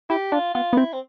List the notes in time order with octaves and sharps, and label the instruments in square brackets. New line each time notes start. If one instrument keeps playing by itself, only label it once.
[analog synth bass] E4 [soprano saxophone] G4
[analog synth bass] D4 [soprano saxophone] F4
[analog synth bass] B3 [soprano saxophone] F4
[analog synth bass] B3
[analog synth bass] C4 [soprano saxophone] E4
[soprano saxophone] C4